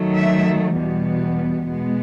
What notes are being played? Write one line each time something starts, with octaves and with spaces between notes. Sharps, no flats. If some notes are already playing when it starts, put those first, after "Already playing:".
Already playing: D#3 F#3 A3
E5
E2 B2 G3 B3
B2 G#3 B3